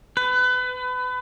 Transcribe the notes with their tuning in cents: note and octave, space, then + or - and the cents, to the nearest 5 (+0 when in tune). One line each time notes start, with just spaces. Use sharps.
B4 +30